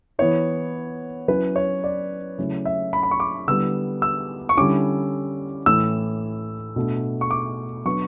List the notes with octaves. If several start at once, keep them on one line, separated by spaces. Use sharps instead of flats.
E3 B3 E4 C#5
F#3 C#4 E4 B4
C#5
D5
C#3 F#3 A3 C#4 E4
E5
B5
B5
C#6
D6
D3 G3 B3 E4 E6
E6
C#6
D3 G3 C#4 E4 D6
A2 E3 A3 E6
B2 A3 D4
C#6
D6
F#3 B3 D4 C#6